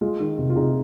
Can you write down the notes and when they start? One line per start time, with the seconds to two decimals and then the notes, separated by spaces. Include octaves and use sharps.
0.01 G#3 F4
0.20 D#3
0.38 C3
0.50 F4
0.56 C3 D#4 G#4